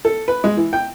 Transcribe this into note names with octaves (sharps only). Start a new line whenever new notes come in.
A4
B4
G#3
E3
G5